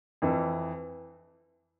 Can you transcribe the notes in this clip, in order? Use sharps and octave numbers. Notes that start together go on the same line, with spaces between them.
F2 E3